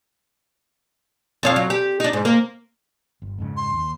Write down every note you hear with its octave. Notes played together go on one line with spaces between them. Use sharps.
F2 C#5 F5
F#3
G4
D4 D#4
G#2
A#3
G1
F2 G#2 C#3
C6
D#2